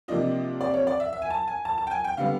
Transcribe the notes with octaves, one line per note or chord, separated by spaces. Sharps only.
C3 F3 A#3 D4 F4 D#5
D5
C#5
D5
E5
E5
G#5
A5
G#5
A5
A5
G5
G#5
G5
D3 G3 B3 F5